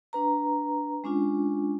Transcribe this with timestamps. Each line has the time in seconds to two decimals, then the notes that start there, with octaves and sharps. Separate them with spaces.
0.13 D4 B4 A#5
1.04 G#3 C#4 D4 F4